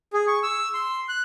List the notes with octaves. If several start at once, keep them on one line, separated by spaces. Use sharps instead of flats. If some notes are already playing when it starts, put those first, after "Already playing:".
G#4
C#6
E6
C6
F#6